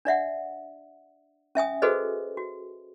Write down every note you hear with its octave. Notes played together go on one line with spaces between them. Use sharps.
D4 D5 E5 F#5
C#4 E5 G#5 D#6
F#4 G#4 A4 B4 C5 D#5
F#4